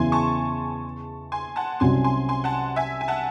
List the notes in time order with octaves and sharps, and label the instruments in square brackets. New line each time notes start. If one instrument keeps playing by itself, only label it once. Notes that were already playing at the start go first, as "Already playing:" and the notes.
Already playing: [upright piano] E2 C#3 E3 [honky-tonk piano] G#5 C6
[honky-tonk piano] A5 C#6
G#5 C6
F#5 A5
[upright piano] C2 C3 F#3 C#4 [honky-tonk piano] G#5 C6
[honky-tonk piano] G#5 C6
G#5 C6
F#5 A5
E5 G#5
G#5
F#5 A5